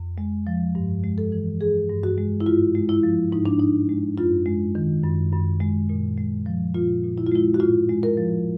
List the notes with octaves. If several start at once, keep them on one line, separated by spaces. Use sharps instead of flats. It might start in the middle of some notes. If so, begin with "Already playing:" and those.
Already playing: F2
G#3
F3
G2
G#3
A4
E3
G2 G#4
G2
F#4
G#3
E4
G#2 F4
G#3
E4
F3
G#2 D#4
D4
G#2 D#4
G#3
F#2 F4
G#3
D#3
F#2
F#2
G#3
A#2
G#3
F3
A#2 F4
A#2
E4
F4
G#3 E4
F#4
A2 F4
G#3
A#4
F3